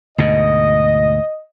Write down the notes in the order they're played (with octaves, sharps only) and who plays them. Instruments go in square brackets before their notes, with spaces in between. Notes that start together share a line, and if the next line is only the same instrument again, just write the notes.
[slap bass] D2 G#2 B2 [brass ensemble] D#5